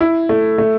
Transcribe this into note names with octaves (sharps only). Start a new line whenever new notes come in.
E4
A3
A3